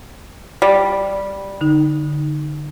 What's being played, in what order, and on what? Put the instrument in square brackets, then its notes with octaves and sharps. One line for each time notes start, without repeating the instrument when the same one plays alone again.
[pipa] G3
[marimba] D3 D#4